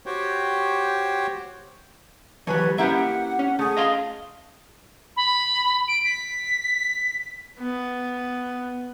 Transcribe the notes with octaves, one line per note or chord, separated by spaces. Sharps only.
F#4 G4 C5 C#5 G5
E3 F#3 G3 B4 C#5 G#5
A#3 C#4 E4 G4 E5 F#5
C#4
A3 G#4 G#5
D#5 F5 C6
B5
D7
B6
B3